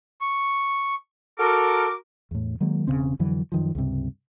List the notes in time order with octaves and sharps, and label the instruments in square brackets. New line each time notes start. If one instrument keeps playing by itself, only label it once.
[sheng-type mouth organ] C#6
[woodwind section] F#4 A#4 D6 [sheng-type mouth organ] A4
[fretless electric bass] E2 A2
D#3 F#3 G#3 A#3
E1 C#2 C#3 C4
F2 D3 E3 F#3
F#2 D#3 F3
C#2 G2 C3